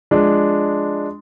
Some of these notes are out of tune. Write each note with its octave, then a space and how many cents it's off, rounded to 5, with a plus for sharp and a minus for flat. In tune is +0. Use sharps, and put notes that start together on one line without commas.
F3 +0 G#3 +0 D4 +0